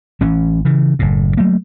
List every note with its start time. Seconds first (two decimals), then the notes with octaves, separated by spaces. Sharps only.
0.21 A1 E3 C#4
0.65 C#3 E3
0.99 F#1 A2
1.37 F#3 A3 A#3